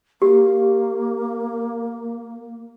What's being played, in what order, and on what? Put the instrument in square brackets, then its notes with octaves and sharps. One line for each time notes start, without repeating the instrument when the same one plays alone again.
[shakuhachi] A#3 [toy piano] G4